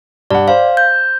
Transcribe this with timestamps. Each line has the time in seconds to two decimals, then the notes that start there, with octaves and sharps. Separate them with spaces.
0.30 G2 D5 F#5
0.48 C5 F5
0.77 G6